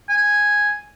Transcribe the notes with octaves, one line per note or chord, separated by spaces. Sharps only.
G#5